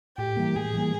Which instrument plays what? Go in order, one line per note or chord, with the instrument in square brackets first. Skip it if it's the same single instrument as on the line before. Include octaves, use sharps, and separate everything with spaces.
[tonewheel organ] A2 [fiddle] G4
[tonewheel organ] E3 G3 A#3
[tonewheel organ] A2 [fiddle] G#4
[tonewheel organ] E3 G3 A#3